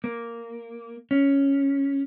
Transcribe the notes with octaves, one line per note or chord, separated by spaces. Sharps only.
A#3
C#4